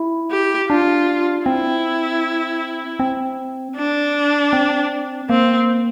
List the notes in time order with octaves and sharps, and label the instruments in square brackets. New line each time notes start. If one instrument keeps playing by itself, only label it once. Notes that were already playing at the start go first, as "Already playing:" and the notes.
Already playing: [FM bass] E4
[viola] G4
[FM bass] D4 [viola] F4
[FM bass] C4 [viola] E4
[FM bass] C4
[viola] D4
[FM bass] C4
[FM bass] A#3 [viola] C4